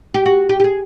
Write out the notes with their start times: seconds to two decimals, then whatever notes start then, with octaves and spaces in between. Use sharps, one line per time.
0.14 G4
0.26 F#4
0.49 G4
0.60 G4
0.64 G#4